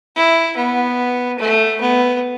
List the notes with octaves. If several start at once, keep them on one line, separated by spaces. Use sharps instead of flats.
E4
B3
A3
B3